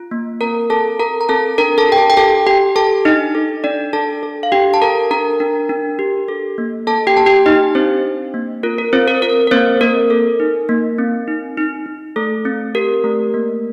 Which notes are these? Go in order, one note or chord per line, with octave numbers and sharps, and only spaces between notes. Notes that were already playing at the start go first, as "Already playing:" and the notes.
Already playing: F4
A#3
C4 A#4 A#5
C4 A4 A5
A4 A#4 A#5
A#5
C4 A4 A5
D4 A#4 A#5
A4 A5
G4 G5
A4 A5
G5
G4 A4 A5
G4 G5
A4 A5
D4 D#4 D#5
A4
D4 D5
D4 A4 A5
A4
F5
D4 G4 G5
A5
A4 A#4 A#5
D4 A#4 A#5
D4
D4
G4
A4
A#3
A#3 A4 A5
G4 G5
A#3 A5
G4 G5
D#4 G4 D#5
C4 D4 C5
D4
A#3
F4 A#4
A#4
C4 F4 C5
A#4
F4 A#4
A#4
A#3 C4 C5
A#3 A#4
A4
D#4
A#3
C4
D#4
D#4
D#4
A3 A4
C4
G4 A#4
A3
A#3